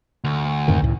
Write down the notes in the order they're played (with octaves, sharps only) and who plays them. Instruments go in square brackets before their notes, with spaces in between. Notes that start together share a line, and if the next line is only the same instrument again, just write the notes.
[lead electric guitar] D2
[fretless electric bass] F2 G#2 D#3
C#2 A2